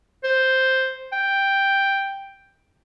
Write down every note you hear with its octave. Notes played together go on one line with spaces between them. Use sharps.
C5
G5